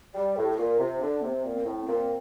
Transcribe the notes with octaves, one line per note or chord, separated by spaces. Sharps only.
G3 D5
A2 A4
G4
A4
A#2 F4
C3 F4
D3 D4
C3 A#3
C4
A#2
C4
A2
A#2 C4